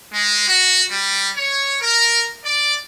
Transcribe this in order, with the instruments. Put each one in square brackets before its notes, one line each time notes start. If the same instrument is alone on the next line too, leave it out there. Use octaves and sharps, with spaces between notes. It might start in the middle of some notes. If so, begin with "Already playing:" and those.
[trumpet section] G#3
F#4
G3
C#5
A#4
D5